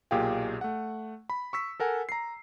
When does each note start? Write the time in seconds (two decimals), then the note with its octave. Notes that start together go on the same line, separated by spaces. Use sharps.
0.11 B1 A#2 G4 G#4 F5 G5
0.61 A3 F#5
1.30 B5
1.53 C#6 E6 B6
1.80 A4 A#4 F#5 G#5
2.09 A#5 C7